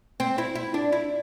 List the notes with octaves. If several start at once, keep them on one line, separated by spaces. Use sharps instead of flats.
C4
E4
E4
D4
E4